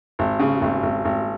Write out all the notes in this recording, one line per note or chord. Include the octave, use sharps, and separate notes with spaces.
G#1
C#3
G#1
G#1
G#1